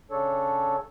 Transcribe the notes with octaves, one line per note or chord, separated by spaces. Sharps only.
C#3 D4 A4 C#5